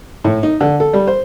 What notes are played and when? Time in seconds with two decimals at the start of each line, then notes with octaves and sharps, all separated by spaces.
0.24 A2
0.43 D#4
0.61 D3
0.80 A4
0.93 G3
1.07 C5